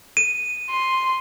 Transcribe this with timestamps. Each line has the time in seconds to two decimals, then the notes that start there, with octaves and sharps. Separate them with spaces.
0.17 D#7
0.70 C6